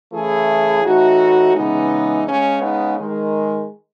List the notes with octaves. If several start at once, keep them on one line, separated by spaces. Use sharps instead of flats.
C#3 E3 A3 E4 G#4
A2 E3 A3 D#4 F#4
C#3 E3 G#3 B3 D#4
C#3 G#3 C#4
B3 D#4
D#3 G#3